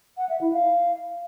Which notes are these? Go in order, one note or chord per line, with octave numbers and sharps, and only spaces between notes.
F#5
E5
E4
F5